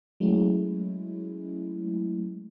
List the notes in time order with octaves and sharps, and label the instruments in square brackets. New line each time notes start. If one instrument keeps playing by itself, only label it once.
[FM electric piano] F#3 G#3 A3 C#4 E4